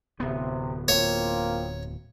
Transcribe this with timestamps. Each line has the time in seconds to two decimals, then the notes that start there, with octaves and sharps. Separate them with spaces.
0.20 D1 C3 B3
0.88 A#3 C4 F4 C#5